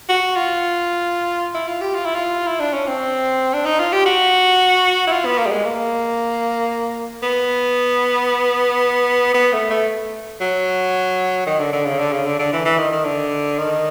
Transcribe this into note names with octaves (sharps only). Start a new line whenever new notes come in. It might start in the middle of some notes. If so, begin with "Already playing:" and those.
F#4
F4
E4
F4
G4
F4
E4
F4
E4
D4
C#4
C4
D4
D#4
F4
G4
F#4
E4
F4
B3
A#3
G3
G#3
A#3
B3
B3
A3
A3
F#3
D#3
D3
D3
C#3
D3
C#3
D3
D3
E3
E3
D#3
D#3
D3
D#3